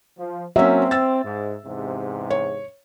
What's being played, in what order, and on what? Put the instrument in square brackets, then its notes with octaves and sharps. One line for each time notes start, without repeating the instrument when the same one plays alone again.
[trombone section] F3
[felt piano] F#3 A#3 C#4 [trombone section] C4 [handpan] E5
[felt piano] E6 A6
[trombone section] G#2
E2 G#2 C3
[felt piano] C#5